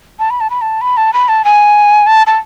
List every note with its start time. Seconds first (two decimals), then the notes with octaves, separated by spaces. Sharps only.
0.19 A5
0.30 B5
0.41 A5
0.50 B5
0.61 A5
0.81 B5
0.97 A5
1.13 B5
1.28 A5
1.45 G#5
2.06 A5
2.27 A5